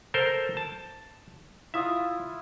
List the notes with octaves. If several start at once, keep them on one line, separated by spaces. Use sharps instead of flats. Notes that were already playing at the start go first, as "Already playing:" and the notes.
A4 A#4 C5
A5
E4 F4 E5 D#6